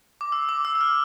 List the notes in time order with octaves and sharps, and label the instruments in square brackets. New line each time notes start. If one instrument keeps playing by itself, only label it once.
[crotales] D6
E6
D6
E6
E6
F6